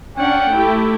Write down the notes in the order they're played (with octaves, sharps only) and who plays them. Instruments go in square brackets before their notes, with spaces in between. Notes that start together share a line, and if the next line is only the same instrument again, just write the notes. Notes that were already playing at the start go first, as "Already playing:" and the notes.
[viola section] C#4 D4 F#5 [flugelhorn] G5
[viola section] A3 E4 G4